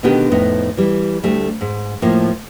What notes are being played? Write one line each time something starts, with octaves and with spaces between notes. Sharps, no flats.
B2 D3 D#3 B3 D#4 G4
F2 A2 B3 D#4
E3 G3
D2 G3 A3
G#2
A2 F3 A#3